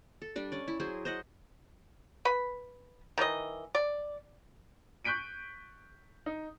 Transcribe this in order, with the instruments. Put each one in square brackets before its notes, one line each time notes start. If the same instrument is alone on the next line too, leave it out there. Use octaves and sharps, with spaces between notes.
[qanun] A4
G3 D4
C#4 D5
E4
F#3 E4 G#4 C5
C5 D#5 F#5
[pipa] B4 B5
D#3 E3 D4 D#5
D5
[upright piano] C#6 F#6 G6 B6 D7 D#7
D#4